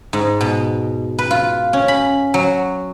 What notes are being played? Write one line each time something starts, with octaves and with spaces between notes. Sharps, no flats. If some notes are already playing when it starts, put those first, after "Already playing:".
G#2
B2
B4
F4
C#4
B5
F#3